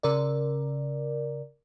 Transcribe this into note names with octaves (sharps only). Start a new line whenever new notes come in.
C#3 A#4 D5